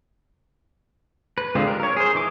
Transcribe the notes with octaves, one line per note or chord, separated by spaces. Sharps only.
B4
D3 G#3 C4 F4 G4
A#4
A#4 C#5
G#4 C5
E3 D#4 D6